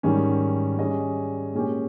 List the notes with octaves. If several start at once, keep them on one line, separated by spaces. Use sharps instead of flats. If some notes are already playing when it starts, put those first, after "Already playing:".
G#2 D#3 G3 C#4
G3 C#4 G#4 D#5
A#2 G#3 C#4 G4